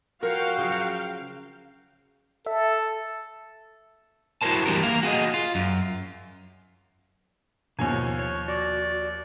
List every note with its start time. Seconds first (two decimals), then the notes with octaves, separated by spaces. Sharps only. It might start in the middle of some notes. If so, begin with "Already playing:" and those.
0.23 F3 F#4 A#4 C#5 F5 G5
0.58 C#3 F3 F#3
2.46 A4 E5
4.42 E4 F#4 G#4 A#4 C5 A5
4.66 E3 G3 D4 G4 A#4
4.83 A#3 F5
5.03 F#4 G#4 B4 D#5
5.34 F4
5.55 F#2
7.79 D#2 B2 F3 A#3 C#5 G#5
8.19 C#5
8.48 F#4 D5